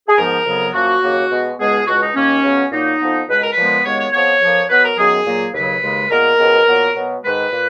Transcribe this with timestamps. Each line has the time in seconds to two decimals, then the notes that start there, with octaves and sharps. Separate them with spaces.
0.08 G#4
0.17 G#2 F3 B3 A#4
0.46 F2 C#3 F#3 B3
0.73 F#2 F3 A#3 F#4
1.03 D#2 C#3 F#3 A#3
1.30 B2 G#3 B3
1.58 C#2 B2 G#3 B3 G#4
1.87 C#2 B2 G#3 F#4
2.01 D#4
2.15 D#2 D#3 A#3 C#4
2.43 C#2 C#3 F#3 B3
2.71 A#2 F#3 A#3 D#4
3.00 F2 F3 B3
3.28 C#2 B2 G#3 B4
3.40 A#4
3.51 B4
3.57 A#2 F3 G#3 B3
3.84 D#2 C#3 G#3 B3 C#5
3.98 C#5
4.12 F2 F3 B3 C#5
4.40 F2 F3 A#3
4.69 B2 F#3 B3 B4
4.83 A#4
4.97 F#2 D#3 F#3 B3 G#4
5.25 A#2 F#3 A#3
5.54 D#2 C#3 F#3 B4
5.82 D#2 C#3 G#3
6.10 A#2 G#3 B3 A#4
6.38 C#2 B2 G#3 B3
6.67 A#2 F#3 B3
6.95 B2 F#3 B3
7.23 G#2 D#3 G#3 B4
7.51 A#2